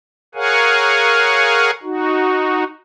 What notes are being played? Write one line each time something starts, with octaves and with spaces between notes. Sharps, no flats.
G#4 A#4 C#5 F5 F#5 G#5
D#4 F#4